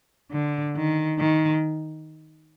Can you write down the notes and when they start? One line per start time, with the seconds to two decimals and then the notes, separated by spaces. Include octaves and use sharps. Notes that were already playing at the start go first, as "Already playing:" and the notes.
0.32 D3
0.76 D#3
1.19 D#3